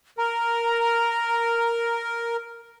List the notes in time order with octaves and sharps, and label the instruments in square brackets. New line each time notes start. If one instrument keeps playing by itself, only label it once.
[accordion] A#4 [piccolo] A#5